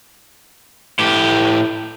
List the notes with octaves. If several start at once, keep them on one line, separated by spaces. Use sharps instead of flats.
A2 G4